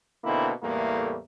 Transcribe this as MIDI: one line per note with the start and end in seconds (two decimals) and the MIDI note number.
0.24 0.50 47
0.24 0.50 50
0.24 0.50 58
0.24 0.50 60
0.24 0.50 63
0.24 0.50 64
0.63 1.17 40
0.63 1.17 45
0.63 1.17 55
0.63 1.17 57
0.63 1.17 58